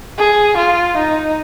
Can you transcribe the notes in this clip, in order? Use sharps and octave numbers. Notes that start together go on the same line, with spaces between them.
G#4
F4
D#4